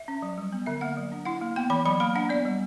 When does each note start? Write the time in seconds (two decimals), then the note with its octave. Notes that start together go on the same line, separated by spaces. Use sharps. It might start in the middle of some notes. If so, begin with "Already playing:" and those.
Already playing: E5
0.08 C#4
0.22 F#3
0.38 G3
0.53 B3
0.66 D3 E5
0.81 A#3 F#5
0.97 F#3
1.12 D4
1.25 E4 F#5
1.41 A#3
1.56 B3 G5
1.70 E3 B5
1.85 F#3 B5
2.00 A#3 B5
2.15 D4 F#5
2.29 B3 D5
2.45 G3